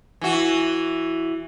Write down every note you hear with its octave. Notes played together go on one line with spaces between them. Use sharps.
E3 F#4